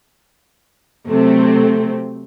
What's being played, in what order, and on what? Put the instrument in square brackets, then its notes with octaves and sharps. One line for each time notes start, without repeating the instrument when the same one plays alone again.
[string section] C3 F#3 A3 C4